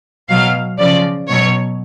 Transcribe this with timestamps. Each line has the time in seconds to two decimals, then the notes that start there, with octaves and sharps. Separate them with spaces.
0.29 B2 F#3 F5
0.79 C#3 F3 D5
1.28 B2 F#3 C#5